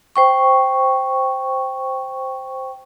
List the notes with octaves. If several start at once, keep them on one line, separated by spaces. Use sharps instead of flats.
C5 G5 C#6